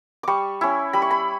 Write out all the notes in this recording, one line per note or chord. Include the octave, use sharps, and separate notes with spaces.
G3 C#6 D6
C#4 E4
G3 B5
C#6
B5